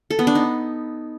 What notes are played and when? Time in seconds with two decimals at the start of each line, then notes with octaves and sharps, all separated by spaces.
0.11 A4
0.19 B3
0.27 D4
0.35 D#4